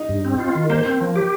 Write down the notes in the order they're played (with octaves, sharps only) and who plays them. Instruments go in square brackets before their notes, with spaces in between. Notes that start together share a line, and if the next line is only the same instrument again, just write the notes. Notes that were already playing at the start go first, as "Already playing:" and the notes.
Already playing: [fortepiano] D#4
[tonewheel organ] G2
C4
F4
D#3
[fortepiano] A#3 [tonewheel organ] C5
[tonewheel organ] C4
F3
G4